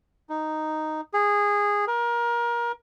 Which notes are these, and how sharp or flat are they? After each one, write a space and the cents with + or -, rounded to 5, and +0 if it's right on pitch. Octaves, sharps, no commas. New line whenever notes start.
D#4 -5
G#4 -15
A#4 +25